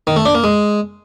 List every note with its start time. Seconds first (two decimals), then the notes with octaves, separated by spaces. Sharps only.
0.07 D#3
0.16 A3
0.26 D4
0.35 A#3
0.44 G#3